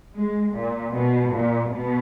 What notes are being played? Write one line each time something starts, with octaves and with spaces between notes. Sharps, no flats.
G#3
A#2
B2
A#2
B2